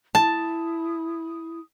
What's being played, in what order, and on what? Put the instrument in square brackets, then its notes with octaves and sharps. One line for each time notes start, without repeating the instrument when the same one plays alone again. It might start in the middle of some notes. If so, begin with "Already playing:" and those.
[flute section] E4 D#6 [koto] A5